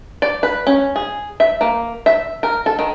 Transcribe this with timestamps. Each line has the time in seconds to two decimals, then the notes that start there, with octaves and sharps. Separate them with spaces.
0.22 D5
0.43 B4
0.67 C#4
0.96 G#4
1.40 E5
1.61 A#3
2.06 E5
2.43 A#4
2.66 A4
2.79 D#3